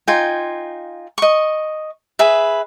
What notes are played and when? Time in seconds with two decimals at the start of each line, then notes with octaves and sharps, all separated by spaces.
0.08 D#4 F4 G5 G#5
1.18 D#5 C#6
2.19 G#4 B4 E5